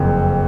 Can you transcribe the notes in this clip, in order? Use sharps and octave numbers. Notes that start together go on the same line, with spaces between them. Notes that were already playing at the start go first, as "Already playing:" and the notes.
Already playing: F#1 F2